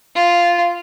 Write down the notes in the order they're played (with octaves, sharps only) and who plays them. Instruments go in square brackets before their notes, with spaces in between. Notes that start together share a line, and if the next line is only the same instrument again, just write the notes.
[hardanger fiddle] F4